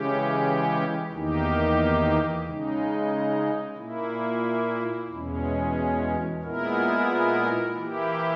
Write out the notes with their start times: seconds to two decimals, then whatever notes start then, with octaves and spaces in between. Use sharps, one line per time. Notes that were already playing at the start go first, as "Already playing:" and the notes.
Already playing: C#3 E3 G#3 C#4 G4
1.11 E2 D#3 A#3 D#4 G4
2.43 C#3 G#3 D#4
3.77 A#2 A#3 E4
5.09 E2 B2 G#3 C#4
6.42 A#2 G#3 B3 E4 A#4
7.75 E3 A#3 E4 G4